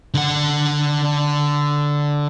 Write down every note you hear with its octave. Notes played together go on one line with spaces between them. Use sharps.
D3 F#5